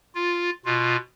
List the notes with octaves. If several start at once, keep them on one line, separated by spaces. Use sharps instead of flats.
F4
B2 F4